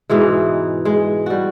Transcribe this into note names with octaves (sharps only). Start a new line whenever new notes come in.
G#2 B2 E3 G#3
G#3
G3 F#4